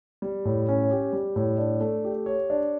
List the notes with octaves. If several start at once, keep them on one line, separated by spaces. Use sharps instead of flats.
G3
A2
C#4
G4
G3
A2
D4
A3
G4
C#5
D4